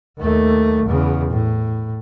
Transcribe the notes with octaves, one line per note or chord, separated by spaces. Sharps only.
D#2 A3
E2 C#3
A2